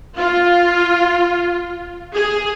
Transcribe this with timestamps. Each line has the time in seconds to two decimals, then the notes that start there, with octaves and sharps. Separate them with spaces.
0.18 F4
2.15 G#4